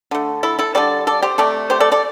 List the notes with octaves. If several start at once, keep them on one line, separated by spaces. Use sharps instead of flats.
D3 A3
E4 A4
E4 A4
D3 G3 A4 D5
A4 D5
G4 C5
C3 A3 A4 D5
G4 C5
A4 D5
A4 D5